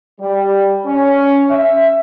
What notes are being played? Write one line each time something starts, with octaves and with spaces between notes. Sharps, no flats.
G3
C#4
E5